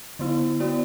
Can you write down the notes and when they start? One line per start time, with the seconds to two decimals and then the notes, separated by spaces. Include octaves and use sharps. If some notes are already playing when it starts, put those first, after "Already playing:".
0.19 D3 B3 E4
0.60 B3 F#4 D5